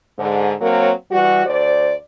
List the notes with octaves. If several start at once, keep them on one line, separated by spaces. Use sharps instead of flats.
G#2 D3
F#3 A#3 C4 A#4 C#5
E3 G3 F#4
D2 C5 D5